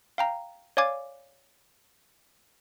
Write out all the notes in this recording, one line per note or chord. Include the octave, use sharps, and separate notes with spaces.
F5 G5 A#5
C#5 D5 F5 G#5 D6 G#6